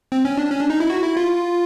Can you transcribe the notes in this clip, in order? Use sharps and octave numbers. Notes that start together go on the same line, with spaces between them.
C4
C#4
D4
C#4
D4
D#4
E4
F#4
E4
F4